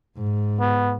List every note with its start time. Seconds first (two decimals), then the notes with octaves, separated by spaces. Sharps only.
0.17 G#2
0.60 B3